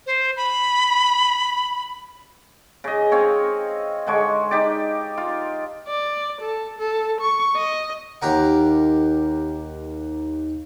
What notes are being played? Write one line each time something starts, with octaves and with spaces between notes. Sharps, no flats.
C5
B5
C#3 D#5
C4 C#5 F5
D3 G#3 C#5
D#4 G4 D5
F4
D5
A4
A4
C#6
D#5
D#2 G4 A#4 F#5